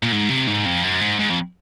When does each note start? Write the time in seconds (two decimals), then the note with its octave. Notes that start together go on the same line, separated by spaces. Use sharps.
0.03 A#2
0.12 G#2
0.29 C3
0.47 G#2
0.65 F2
0.84 F#2
1.01 G#2
1.19 G#2
1.29 F2